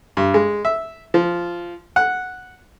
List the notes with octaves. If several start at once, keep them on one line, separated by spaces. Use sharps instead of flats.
G2
G#3
E5
F3
F#5